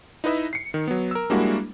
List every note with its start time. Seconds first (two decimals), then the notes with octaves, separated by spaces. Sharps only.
0.24 D#4 E4 B4 D#5 E5
0.53 C7 C#7
0.74 D#3
0.88 F#3 B3
1.11 A#4 E6
1.30 G3 G#3 A#3 D4 E4 F#4